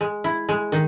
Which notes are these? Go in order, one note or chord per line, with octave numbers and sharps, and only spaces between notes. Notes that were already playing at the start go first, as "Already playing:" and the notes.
G#3
E4
G#3
D#3